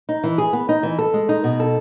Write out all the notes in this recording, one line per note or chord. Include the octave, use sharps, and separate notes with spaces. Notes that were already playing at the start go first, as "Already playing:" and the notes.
D#4
E3
G#4
B3
D#4
E3
A4
G#3
D#4
B2
A4